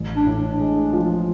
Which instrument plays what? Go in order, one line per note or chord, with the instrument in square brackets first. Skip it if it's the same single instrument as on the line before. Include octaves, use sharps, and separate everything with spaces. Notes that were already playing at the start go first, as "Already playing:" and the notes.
Already playing: [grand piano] A1
[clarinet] D4
[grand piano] A2
[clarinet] D4
[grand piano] G#3
F3